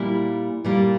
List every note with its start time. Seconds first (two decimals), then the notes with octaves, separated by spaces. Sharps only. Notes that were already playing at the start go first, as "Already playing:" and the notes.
Already playing: A#2 G3 A#3 E4
0.65 A#2 G3 A#3